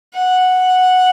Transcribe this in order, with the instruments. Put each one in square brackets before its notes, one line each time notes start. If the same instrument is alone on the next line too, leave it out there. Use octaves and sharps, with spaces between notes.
[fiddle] F#5